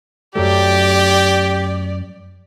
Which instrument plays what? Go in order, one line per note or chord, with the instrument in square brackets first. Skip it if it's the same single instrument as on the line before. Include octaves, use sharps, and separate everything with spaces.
[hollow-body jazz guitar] F#2 F#3 A3 [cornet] G4 [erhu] D5